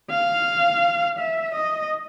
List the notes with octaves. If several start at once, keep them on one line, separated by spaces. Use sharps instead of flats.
F5
E5
D#5